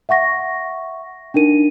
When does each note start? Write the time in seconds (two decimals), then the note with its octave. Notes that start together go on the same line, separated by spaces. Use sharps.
0.09 E5 F#5 C#6 A#6
1.34 D4 D#4 A#4 D#7